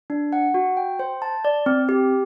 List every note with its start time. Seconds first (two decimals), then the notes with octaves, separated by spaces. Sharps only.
0.10 D4
0.33 F#5
0.54 F#4
0.77 G5
0.99 C5
1.22 A5
1.45 D5
1.66 C4
1.89 G4